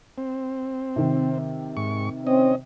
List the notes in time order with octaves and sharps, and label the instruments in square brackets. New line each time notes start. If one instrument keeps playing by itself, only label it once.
[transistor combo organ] C4
[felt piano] C3 D#3
[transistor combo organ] G#2 C#6
[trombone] C4 [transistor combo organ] C#4 D#5